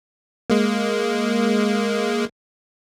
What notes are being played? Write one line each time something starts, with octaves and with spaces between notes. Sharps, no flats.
G#3 A#3